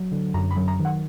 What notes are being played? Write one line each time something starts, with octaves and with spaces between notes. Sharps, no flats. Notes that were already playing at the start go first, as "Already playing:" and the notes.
Already playing: F#3
D3
F#2 A#5
B5
F#3
A#5
D#3
F#5